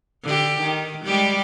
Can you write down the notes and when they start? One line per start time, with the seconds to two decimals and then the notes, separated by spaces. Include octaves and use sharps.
0.24 D3 G4
0.62 D#3
1.05 G3 G#3 G4